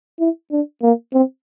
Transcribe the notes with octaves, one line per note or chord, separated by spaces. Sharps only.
E4
D4
A#3
C4